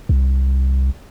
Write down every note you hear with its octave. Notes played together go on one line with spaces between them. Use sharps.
C2